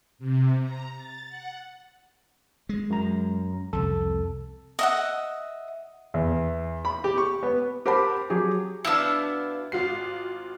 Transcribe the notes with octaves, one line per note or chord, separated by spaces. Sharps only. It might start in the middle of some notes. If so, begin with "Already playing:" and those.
C3
A#5
A6
F#5
G#3
F#2 A#5
C2 F2 A4
D#5 E5 F#5
E2
B5
G4
C#6
B3
G4 A#4 C5 F#5 A5 B5
F#3 G4 G#4
B2 B3 D4 E4 F5 E6
G#1 F4 F#4 C7